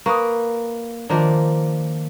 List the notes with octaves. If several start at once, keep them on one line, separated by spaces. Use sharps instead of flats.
A#3 B4 C#6 D#6
D#3 F3 A#3 D4